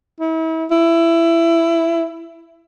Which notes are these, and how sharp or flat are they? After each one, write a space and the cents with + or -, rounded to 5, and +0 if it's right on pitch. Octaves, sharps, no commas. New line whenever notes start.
E4 -35
E4 +15